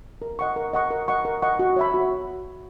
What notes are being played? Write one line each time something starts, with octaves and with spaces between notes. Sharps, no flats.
A#4
D#5 F#5 C#6
A#4
D#5 F#5 C#6
A#4
D#5 F#5 C#6
A#4
D#5 F#5 C#6
F#4
C#5 E5 B5
F#4